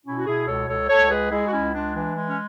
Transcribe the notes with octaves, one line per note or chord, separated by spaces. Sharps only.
B2 C#4 E4
F#4
B2 E4 G#4
C#2 A4 C#5
C#2 A4 C#5
C#2 A4 C#5
G#3 G#4 B4
G#3 E4 G#4
F#4
C#2 C#4 E4
G#3 D4
E3 D4
G#3
C#4